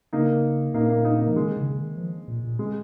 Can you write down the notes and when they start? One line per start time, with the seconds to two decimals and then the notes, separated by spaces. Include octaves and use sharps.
0.13 C#3 A#3 D#4
0.74 A#2 A#3 D#4
0.90 A#3
1.05 A#3 D#4
1.20 A#3
1.28 F3
1.35 D#3 G#3
1.57 C#3
1.71 C#3
1.77 D#3
1.97 F3
2.28 A#2
2.43 A#2
2.59 G#3